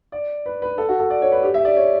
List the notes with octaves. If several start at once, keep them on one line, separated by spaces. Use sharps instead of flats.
D5
B4
B4
A4
F#4
A4
D5
C#5
B4
G4
E5
D5
C#5